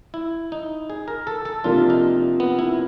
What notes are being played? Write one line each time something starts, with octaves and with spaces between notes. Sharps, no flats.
E4
D#4
G#4
A#4
A4
A4
C3 F3 A#3 D4 F4
D#4
B3
E4